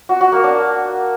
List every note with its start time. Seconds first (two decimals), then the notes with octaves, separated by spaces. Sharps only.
0.09 F#4
0.21 F#4
0.32 A#3
0.44 D4